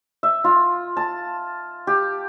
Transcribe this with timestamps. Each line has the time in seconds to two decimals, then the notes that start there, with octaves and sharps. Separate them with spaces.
0.23 E5
0.44 F4
0.97 A5
1.87 G4